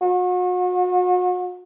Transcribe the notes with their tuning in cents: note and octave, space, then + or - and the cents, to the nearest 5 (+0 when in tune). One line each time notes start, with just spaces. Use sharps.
F#4 -40